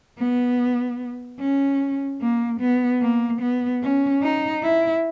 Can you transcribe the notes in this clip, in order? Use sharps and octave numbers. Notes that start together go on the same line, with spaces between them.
B3
C#4
A#3
B3
A#3
B3
C#4
D#4
E4